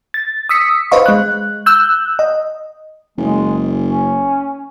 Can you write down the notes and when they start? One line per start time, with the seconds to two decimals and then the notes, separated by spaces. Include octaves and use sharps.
0.14 A6
0.49 D#6 E6 B6 C#7
0.91 B4 C5 D#5 F5 C#6
1.06 G#3 F#6
1.66 E6 F#6 G6
2.19 D#5
3.18 F#1 G#3
3.82 C#4